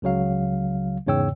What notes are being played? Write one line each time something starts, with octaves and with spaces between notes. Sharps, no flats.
C#2 C#3 F#3 F5
E2 G#2 C#3 C#5 G5 E6